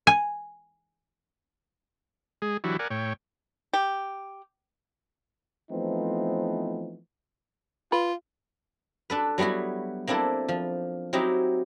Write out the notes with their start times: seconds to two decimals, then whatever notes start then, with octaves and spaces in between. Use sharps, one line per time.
0.07 G#5
2.42 G#3 G#4
2.64 E3 F#3 D4 E4 F#4 G4
2.79 A#4 D5 F#5 G#5
2.90 A2 C#5 G5
3.73 G4
5.71 E3 F3 A3 B3 C4 D#4
7.92 F4 B4
9.10 D4 A4 B4
9.38 F#3 G3 B3 E4 F#4
10.07 A#3 C4 D4 E4 A4
10.48 F3
11.13 F#3 C4 D#4 E4 G4